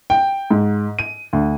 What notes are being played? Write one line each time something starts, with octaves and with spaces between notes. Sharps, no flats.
G5
G#2
D#7
D2